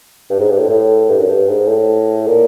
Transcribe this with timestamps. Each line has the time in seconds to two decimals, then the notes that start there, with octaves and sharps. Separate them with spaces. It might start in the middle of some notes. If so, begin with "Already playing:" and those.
0.30 G2
0.40 G#2
0.50 G2
0.59 A2
0.69 A2
1.09 G2
1.19 F#2
1.28 G2
1.48 G#2
1.68 A2
2.27 A#2